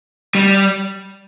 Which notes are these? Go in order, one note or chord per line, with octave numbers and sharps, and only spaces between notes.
G3